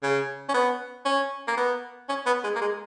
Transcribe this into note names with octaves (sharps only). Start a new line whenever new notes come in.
C#3
C#4
B3
C#4
A#3
B3
C#4
B3
G#3
A#3
G#3